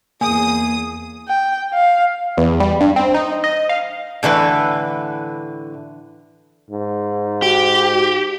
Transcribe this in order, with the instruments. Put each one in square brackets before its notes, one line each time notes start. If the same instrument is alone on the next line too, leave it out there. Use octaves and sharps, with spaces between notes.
[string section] E2 D#6 [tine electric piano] A#3 [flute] G#4 [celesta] G#5
[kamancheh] G5
F5
[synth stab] E2
G3
G2
C4
D#4
D#5
F5
[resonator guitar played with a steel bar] A2 D3 E3 B4
[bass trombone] G#2
[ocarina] F#4 [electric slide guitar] G4